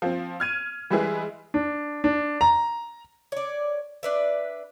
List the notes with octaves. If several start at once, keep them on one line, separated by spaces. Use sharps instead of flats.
F3 C4
F6 G#6 D#7
E3 G3 G#3 E4 G#4 B4
D4
D4
A#5
C#5 D5
D4 B4 E5